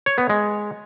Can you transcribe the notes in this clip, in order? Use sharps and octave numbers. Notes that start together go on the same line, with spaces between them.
C#5
B3
G#3